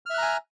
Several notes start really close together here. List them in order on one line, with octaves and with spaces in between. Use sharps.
F6 E5 F#6 A#5 G#5